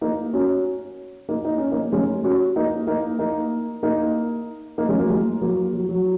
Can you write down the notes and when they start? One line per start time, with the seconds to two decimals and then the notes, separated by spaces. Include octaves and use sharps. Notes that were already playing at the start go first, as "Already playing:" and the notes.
0.01 A#3 D#4
0.33 C#4 F#4
1.29 A#3 D#4
1.45 D#4
1.58 C#4
1.71 A#3 D#4
1.82 A#3
1.92 G#3 C#4
2.24 C#4 F#4
2.56 A#3 D#4
2.87 A#3 D#4
3.19 A#3 D#4
3.83 A#3 D#4
4.78 A#3 D#4
4.89 G#3 C#4
4.99 F#3 A#3
5.10 G#3
5.41 F#3 A#3
5.73 F#3
5.89 F#3